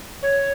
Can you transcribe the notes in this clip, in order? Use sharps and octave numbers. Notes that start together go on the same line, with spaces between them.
C#5